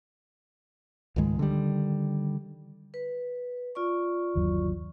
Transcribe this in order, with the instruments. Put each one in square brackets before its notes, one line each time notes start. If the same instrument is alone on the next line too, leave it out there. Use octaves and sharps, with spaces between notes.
[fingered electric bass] C#2 G#2 D#3 G#3
D3 D#3 G3
[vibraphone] B4
F4 D5 C#6
[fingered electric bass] G1 D#2 F#3